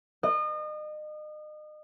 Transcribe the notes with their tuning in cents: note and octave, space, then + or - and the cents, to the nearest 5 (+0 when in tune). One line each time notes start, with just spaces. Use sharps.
D#5 -35